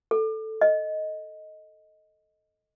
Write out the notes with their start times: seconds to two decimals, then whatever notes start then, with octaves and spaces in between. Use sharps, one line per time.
0.11 A4
0.61 D#5